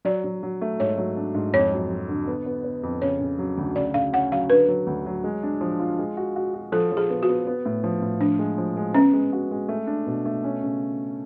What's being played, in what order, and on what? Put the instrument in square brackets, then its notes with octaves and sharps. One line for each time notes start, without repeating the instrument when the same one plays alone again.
[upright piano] F#3 [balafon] D5
[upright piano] F#3
F#3
A3
[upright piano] G#2 [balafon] C#5
[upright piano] F#3
D4
G#2
[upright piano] F2 [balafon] C#5
[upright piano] F#3
F#3
D3
B3
B3
B3
F2
[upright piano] C#3 [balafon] C#5
[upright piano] C#3
F#3
D2
[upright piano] C#3 [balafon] D5
[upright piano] C#3 [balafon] F5
[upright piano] C#4 [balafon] F#5
[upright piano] F#3 [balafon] F5
[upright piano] D3 [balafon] B4
[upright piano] F#3
D2
F#3
G#3
D4
F3
F4
G#3
F#4
F#4
F#4
[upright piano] F3 [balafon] A4
[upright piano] F3
[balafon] G#4
[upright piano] B3
[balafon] F#4
[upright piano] B3
B3
A2
F3
A2
[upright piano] F3 [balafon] D4
[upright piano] G#3
F3
G#3
[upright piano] B3 [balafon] C#4
[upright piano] G#3
F#4
G#3
A3
D4
B2
A3
C#4
C#3